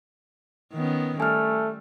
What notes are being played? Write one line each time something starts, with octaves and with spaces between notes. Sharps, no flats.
D#3 B3 C#4
G3 A3 G#5 F6